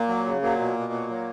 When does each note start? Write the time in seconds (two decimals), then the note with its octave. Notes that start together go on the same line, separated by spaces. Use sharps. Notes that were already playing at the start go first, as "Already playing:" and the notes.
Already playing: A#2 A#3
0.08 F#3
0.26 C#3
0.42 A#2 F#3 A#3
0.59 B2
0.76 B2
0.92 F#3
1.10 F#3